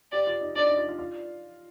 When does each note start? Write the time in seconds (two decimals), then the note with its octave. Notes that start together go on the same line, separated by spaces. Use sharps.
0.12 G4 D5
0.27 F4
0.41 D#4
0.56 D4 D5
0.66 D#4
0.77 F4
0.89 F4
0.99 F4